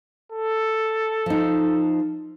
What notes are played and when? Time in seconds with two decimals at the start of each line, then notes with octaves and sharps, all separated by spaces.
0.32 A4
1.26 F3 D#4